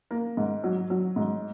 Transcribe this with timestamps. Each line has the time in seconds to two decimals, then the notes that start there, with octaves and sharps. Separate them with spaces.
0.11 A#3
0.37 G#2
0.64 F#3
0.90 F#3
1.16 G#2